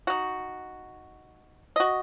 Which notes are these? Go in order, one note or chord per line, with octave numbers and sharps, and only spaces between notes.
D#4 F#4
F#4 D#5